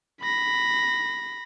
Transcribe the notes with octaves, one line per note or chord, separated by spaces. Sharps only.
B5 A#6